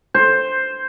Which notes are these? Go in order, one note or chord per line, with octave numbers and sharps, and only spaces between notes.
C5